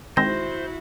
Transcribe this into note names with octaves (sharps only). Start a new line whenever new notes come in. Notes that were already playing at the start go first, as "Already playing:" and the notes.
D#3 G#3 C4 E4 F#4 C5 A#6